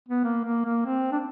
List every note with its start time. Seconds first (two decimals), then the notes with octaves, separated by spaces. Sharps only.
0.09 B3
0.24 A#3
0.45 A#3
0.65 A#3
0.86 C4
1.12 D4